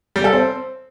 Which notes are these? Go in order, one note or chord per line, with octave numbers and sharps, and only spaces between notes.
G3
A4
C4